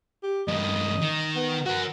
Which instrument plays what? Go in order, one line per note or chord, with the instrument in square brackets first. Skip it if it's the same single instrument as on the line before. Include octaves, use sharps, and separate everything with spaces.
[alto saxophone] G4
[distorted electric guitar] G2 D#3 [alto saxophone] D#5
[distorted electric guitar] D#3
[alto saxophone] B3
[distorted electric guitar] F#4 A#4 [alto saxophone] F#5